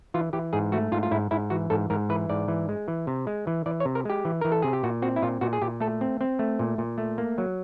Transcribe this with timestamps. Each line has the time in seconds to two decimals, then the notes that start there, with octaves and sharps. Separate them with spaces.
0.14 E3 F4
0.33 E3 G4
0.53 G#2 G#4
0.72 A3 F#4
0.92 G#2 F4
1.03 F4
1.11 G#2 E4
1.31 G#2 E4
1.50 E3 F#4
1.70 G#2 A4
1.90 G#2 A#4
2.09 E3 B4
2.30 G#2 D5
2.48 E3
2.69 G#3
2.88 E3
3.07 C3
3.27 G#3
3.47 E3
3.66 E3 D5
3.80 C#5
3.85 C3
3.95 A#4
4.05 G#3 G4
4.25 E3
4.41 E3 A#4
4.52 A4
4.63 C3 G#4
4.73 G4
4.83 A#2 F#4
5.02 C4 F#4
5.16 E4
5.22 A#2 F4
5.41 A#2 F#4
5.53 G#4
5.62 A#2 G4
5.80 A3 A4
6.01 C4
6.21 C4
6.39 A3
6.59 A#2
6.78 A#2
6.98 A3
7.18 A#3
7.38 F#3